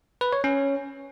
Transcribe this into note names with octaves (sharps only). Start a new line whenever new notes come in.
B4
C#5
C#4